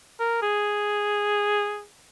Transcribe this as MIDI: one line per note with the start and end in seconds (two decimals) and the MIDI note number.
0.20 0.39 70
0.42 1.83 68